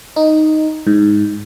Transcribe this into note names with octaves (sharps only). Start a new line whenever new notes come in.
D#4
G#2